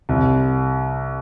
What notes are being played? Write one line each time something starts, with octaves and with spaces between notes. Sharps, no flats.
C2